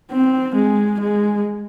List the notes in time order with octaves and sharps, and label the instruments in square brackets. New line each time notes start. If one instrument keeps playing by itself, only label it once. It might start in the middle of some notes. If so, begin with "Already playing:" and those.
[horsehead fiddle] C4
G#3
G#3